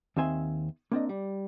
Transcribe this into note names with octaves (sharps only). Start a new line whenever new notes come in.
D#2 D#3 C4 E5 G#5 C6
A#3 C4 D4 D#5
G3